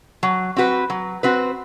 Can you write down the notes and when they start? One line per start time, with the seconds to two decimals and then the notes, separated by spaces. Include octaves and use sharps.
0.23 F#3
0.56 C4 F#4 B4
0.90 F#3
1.23 C4 F#4 B4